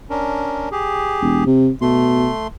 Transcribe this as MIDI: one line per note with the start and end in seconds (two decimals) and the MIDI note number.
0.10 0.69 61
0.10 0.69 62
0.10 0.69 70
0.72 1.44 67
0.72 1.44 68
1.21 1.43 28
1.46 1.69 48
1.81 2.28 47
1.81 2.47 57
1.81 2.47 84